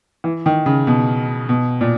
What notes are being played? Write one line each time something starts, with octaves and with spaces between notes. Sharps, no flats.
E3
D#3
C#3
B2
B2
A#2